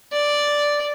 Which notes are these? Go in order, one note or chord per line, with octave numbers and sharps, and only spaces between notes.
D5